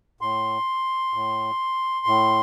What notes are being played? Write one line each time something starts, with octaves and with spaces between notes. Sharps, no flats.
A2 C6
A2
A2